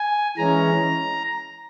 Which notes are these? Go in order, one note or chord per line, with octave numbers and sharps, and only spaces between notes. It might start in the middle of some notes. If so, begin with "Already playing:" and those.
Already playing: G#5
E3 G#3 C#4 A#5